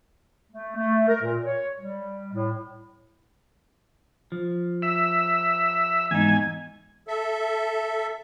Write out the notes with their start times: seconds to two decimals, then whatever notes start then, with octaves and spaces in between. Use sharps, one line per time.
0.52 A3
0.76 A3
1.08 A#4
1.22 A#2
1.44 C#5
1.80 G3
2.33 A2
4.32 F3
4.82 E5
6.11 E2 G#2 D#4 G#5
7.08 A4 E5